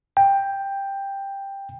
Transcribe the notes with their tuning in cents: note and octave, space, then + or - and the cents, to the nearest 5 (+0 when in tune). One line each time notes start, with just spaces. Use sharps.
G5 +10